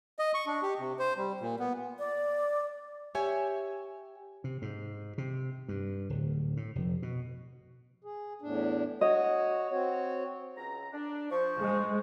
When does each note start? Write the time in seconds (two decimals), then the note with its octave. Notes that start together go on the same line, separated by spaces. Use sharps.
0.19 D#5
0.34 C#6
0.46 D4
0.62 G4
0.79 C3
0.99 C5
1.17 G3
1.41 A#2
1.59 B3
1.99 D5
3.15 G4 C#5 E5 G#5
4.44 C3
4.62 G#2
5.18 C3
5.68 G2
6.10 D1
6.57 A2
6.75 F1
7.02 B2
8.04 G#4
8.42 E2 A2 D4
9.01 F#4 C#5 D#5
9.71 C4 F#4 C#5
10.56 C#2 A#5
10.93 D4
11.30 F3 C5 C#6
11.62 G#3